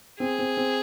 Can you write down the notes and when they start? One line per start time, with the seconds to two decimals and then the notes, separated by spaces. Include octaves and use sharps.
0.20 C4 G#4
0.39 C4
0.57 C4